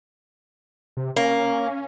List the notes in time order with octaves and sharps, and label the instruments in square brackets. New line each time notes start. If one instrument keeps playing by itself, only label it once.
[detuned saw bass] C3
[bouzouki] A#3 [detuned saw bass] C#4